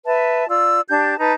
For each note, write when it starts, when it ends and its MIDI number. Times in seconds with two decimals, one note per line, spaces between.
0.06 0.47 71
0.06 0.47 76
0.06 0.47 81
0.49 0.81 65
0.49 0.81 74
0.49 0.81 88
0.90 1.17 62
0.90 1.17 67
0.90 1.17 81
0.90 1.17 91
1.18 1.33 63
1.18 1.33 71
1.18 1.33 81
1.18 1.33 82